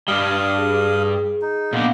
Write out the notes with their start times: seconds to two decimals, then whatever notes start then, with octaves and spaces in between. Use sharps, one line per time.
0.08 G2 G3 F5 D#6
0.58 G#4
1.42 D#4
1.73 A#2 B3 D4 F5 F#5